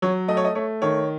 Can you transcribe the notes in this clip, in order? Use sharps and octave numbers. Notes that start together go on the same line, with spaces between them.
F#3 C#5
A3 D#5
C#5
D#5
A3 C#5
D#3 C#5